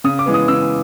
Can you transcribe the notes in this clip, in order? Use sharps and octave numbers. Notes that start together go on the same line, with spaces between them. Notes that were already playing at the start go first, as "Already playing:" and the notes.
C#3 D#6
D6
E3 G#3 B3
D#6
C#3 E6